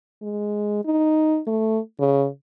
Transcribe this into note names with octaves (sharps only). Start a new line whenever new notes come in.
G#3
D#4
A3
C#3